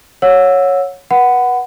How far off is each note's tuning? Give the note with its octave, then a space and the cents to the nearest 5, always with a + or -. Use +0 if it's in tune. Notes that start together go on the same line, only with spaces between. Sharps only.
C#5 -5 F#5 -30 E6 +0
B4 -30 F#5 +5 B5 +25